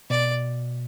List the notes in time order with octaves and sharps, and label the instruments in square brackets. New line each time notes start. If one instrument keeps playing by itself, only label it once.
[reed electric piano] B2 [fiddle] D5